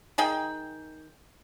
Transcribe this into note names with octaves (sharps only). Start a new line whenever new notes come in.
D#3 D#4 G#4 G5